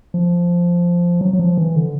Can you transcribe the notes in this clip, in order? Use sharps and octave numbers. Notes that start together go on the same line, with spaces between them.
F3
F#3
F#3
F3
E3
D3